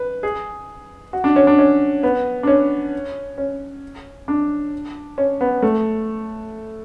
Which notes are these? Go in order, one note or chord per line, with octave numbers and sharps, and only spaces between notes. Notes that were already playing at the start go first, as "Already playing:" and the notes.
Already playing: B4
G#4
F#4
D4
C#4
D4
C#4
B3
D4
C#4
C#4
D4
C#4
B3
A3